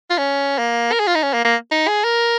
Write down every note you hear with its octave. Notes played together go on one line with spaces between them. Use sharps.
F4
C#4
A#3
A#4
G#4
F4
D#4
C#4
A#3
A#3
D#4
G#4
A#4